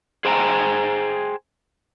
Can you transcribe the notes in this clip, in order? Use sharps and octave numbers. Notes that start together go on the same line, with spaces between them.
G#4 C5 G5 G#5 A#5